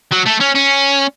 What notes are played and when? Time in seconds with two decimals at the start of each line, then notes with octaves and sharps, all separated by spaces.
0.11 F#3
0.26 A3
0.40 C#4
0.55 C#4